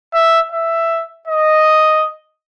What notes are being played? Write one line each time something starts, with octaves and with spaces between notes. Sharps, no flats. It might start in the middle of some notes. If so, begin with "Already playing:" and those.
E5
E5
D#5